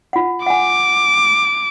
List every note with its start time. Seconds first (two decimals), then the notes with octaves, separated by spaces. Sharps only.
0.13 F4 F#5
0.46 F#5 G#5 D6